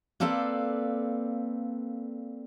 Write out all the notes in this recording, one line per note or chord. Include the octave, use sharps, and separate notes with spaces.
A#3 C4 A4 B4 D5 F5